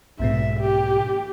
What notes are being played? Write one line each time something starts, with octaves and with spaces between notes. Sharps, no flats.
B1 G#2 B2 E5
G4